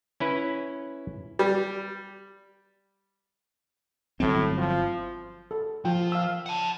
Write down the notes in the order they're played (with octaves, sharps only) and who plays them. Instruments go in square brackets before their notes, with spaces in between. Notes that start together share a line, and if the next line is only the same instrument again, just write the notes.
[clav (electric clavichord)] C#4 E4 B4
[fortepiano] G3
[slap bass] G1 F#3 C4 [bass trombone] A2
[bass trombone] F3
[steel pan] A4
[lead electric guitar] F3 [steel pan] F4 G5
[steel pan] F5 E6
[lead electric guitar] F#5 A5